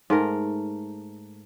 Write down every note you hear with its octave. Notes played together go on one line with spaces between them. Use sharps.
G#2 A3 A#4